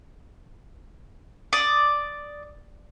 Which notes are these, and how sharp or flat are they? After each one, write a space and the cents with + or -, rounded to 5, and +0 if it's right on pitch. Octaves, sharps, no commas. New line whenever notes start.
D5 +0 D#6 +0